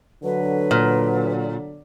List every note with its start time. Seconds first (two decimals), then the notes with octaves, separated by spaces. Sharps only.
0.24 D3 F#3 B4
0.71 A#2